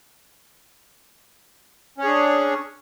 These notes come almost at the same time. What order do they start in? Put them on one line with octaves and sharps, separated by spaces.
C#4 C#5 G#4 D4